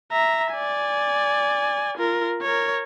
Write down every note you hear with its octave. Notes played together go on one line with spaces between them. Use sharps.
E5 A#5
D5 G#5
F4 A#4
A#4 C#5